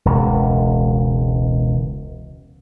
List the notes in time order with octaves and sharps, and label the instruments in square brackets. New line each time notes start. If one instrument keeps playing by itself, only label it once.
[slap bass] E1 C#2